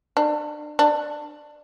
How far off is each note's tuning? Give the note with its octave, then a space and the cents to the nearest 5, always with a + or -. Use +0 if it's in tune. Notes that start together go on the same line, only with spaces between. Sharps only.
D4 +30
D4 +20